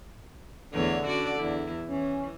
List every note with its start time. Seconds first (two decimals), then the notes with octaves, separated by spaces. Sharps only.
0.74 E2 D3 A3 C#5
1.05 C#4 F#4 D5
1.39 E2 E4
1.88 E3 C#4